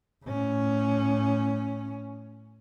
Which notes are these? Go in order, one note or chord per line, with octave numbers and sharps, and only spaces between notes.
A2 C#4